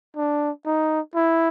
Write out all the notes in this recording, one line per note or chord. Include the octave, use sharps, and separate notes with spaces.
D4
D#4
E4